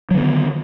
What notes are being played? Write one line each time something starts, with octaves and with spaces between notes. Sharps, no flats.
D3 D#3 F#3 B3